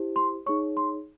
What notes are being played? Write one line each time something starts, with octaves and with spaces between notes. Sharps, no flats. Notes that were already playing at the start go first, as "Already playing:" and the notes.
Already playing: E4 G4 C5
C6
D#4 G#4 C#5 C#6
C6